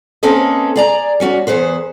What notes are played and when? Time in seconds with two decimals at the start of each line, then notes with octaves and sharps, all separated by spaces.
0.23 A#3 C4 C#4 A4 B4 D#5
0.76 G#4 D5 A#5
1.20 G3 C#4 F#4
1.47 E2 D#3 G#4 B4 C5